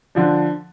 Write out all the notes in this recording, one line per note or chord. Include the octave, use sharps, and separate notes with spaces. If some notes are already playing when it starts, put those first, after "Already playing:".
D3 F3 D4